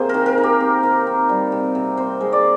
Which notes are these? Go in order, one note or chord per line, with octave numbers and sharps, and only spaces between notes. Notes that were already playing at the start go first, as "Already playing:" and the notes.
Already playing: C3 A#3 G#4 C5
D#3 A#4
A#4
D#3
G4
C4
D#3
C4
G3
C3
C3
C4 C5
G#3
D5